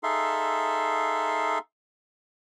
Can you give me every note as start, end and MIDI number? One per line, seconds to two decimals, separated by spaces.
0.03 1.59 63
0.03 1.59 68
0.03 1.59 69
0.03 1.59 76
0.03 1.59 77
0.03 1.59 84